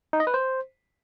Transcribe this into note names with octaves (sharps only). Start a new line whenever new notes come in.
D#4
D#5
B4
C5